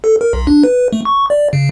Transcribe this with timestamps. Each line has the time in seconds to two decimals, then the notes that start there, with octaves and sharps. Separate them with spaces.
0.04 A4
0.21 A#4
0.33 B1
0.47 D4
0.64 B4
0.93 A3
1.05 C#6
1.30 D5
1.53 C#3